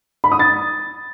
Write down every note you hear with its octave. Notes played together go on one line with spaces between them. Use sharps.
B5
D#6
A6